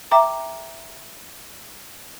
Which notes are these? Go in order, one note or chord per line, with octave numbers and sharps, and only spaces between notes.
E5 G5 A#5 D6